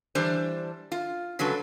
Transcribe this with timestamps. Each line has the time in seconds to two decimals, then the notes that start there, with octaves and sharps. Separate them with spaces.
0.15 E3 G3 D4 C5
0.92 F4
1.39 C#3 F#3 G#3 D4 A4 B4